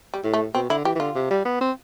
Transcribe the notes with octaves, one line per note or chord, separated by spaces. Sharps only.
G3
A2
A3
B2 C4
D3 E4
E3 G4
E3
D3 F4
C3
G3
B3
C4